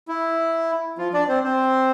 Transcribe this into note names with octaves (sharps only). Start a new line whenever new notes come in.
E4
F3 F4
D4 D5
C4 C5
C4 C5